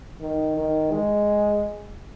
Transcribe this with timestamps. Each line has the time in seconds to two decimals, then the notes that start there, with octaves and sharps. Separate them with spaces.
0.21 D#3
0.57 D#3
0.92 G#3